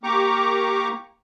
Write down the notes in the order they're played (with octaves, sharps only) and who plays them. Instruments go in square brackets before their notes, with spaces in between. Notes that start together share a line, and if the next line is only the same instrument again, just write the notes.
[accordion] A#3 G4 A#5 C#6 D6